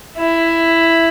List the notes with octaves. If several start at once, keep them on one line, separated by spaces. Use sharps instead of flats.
E4